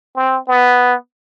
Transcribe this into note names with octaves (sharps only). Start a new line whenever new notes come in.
C4
B3